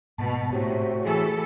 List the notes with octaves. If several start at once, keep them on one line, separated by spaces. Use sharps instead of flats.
G#2 B2 A5
A2 C3 F#4 G4 C#5
E3 G#4 A4